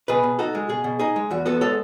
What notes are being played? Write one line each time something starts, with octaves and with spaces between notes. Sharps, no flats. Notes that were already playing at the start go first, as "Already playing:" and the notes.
B2 G#4 B4
B2
D#4 F#4 A4
G#3
B2 G#4
B2
D#4 G#4
G#3
E2 F#4
B3 F#4 A4
G#3 A4 C#5